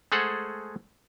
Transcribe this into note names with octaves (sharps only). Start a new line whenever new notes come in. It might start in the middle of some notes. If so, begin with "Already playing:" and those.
G#3 A3 G#4 A4 C5 F#5